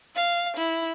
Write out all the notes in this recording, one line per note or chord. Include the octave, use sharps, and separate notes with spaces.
F5
E4